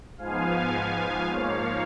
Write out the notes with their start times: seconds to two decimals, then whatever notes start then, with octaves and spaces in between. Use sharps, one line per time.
0.18 G#2 F3 B3 F5 G#5
0.73 F5 G#5
1.28 G#2 F3 A#3 C#5 F5